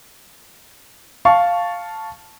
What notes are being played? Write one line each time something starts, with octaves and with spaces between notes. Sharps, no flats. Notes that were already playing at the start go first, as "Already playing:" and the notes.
F5 A5 C#6